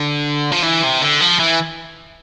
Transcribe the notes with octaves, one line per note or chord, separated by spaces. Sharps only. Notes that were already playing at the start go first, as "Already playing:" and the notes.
Already playing: D3
F3
E3
C3
D3
F3
E3